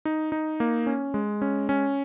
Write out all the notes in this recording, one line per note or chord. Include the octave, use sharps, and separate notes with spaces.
D#4
D#4
A#3
C#4
G#3
C#4
C#4